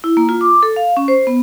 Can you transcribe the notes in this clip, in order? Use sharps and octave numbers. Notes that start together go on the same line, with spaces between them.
E4
A#3
F4
D6
A4
F5
C#4
C5
B3